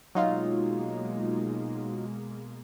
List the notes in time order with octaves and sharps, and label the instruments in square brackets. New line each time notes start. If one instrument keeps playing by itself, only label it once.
[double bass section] B2 G#3 A#3 [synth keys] F#3 D#4 F4